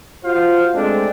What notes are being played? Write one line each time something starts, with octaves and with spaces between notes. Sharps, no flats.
F4 F#4 C5 F5
G#3 A3 C4 D4